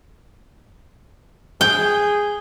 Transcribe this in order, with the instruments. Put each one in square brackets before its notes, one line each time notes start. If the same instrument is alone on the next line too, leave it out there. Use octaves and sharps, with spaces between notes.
[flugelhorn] G#4 [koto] G5